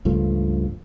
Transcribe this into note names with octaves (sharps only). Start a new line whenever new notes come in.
C#2 G2 F3 A3